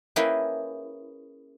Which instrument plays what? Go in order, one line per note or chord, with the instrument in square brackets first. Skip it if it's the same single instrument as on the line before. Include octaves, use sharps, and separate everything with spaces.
[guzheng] A#3 C#4 E4 G#4 B4 G5